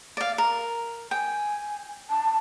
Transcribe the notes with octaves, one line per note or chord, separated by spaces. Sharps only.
D5 F5
A#4
G5 G#5
A5